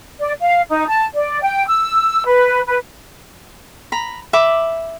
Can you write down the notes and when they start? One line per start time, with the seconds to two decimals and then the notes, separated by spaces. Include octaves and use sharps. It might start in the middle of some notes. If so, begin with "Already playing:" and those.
0.20 D5
0.40 F5
0.69 D#4
0.88 A5
1.15 D5
1.43 G5
1.67 E6
2.27 B4
2.66 B4
3.92 A#5 B5
4.33 E5 B5 D6